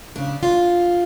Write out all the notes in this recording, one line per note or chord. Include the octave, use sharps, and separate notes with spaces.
C#3 D4
F4